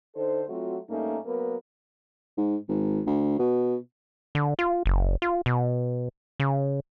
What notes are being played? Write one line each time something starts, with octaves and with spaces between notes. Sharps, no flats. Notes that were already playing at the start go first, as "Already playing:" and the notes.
D3 D#4 A4 C5
F#3 A3 C4 F4 F#4
G2 A3 A#3 C#4 D#4
F#3 A#3 B3 A#4 B4
G#2
G#1
D2
B2
D3
F4
F#1
F4
B2
C#3